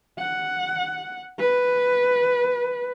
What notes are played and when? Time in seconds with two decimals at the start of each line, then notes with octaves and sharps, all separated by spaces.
0.19 F#5
1.40 B4